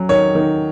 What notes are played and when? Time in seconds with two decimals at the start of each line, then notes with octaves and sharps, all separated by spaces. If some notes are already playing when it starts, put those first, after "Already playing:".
Already playing: F#3 C#4
0.09 D#3 C#5
0.35 D#3